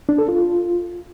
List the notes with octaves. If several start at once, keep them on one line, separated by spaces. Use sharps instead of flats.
D4
A4
F4